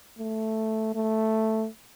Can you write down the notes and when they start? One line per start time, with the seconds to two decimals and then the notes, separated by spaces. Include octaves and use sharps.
0.19 A3
0.95 A3